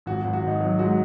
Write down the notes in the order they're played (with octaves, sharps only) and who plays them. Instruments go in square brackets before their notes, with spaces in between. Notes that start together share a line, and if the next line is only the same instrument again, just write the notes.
[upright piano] G#1 F#4
G#1 F#4
F#4
G#1 D#4
F#3
G#2 F#4